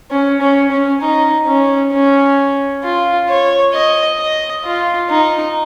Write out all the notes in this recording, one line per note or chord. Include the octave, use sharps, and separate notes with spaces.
C#4
C#4
C#4
D#4
C#4
C#4
F4
C#5
D#5
D#5
F4
D#4